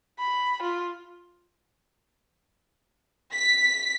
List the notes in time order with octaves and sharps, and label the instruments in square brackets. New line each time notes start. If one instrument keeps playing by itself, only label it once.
[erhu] B5
F4
[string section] B6